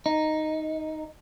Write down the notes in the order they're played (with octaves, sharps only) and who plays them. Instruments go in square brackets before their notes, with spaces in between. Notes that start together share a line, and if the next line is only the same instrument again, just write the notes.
[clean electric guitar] D#4